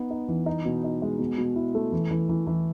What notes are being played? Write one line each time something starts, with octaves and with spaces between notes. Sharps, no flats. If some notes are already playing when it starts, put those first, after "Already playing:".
Already playing: B3 D#4
D#4
E3
D#4
B2
D#4
G#3
B2
B2
E4
A3
E3
E3
E3
E3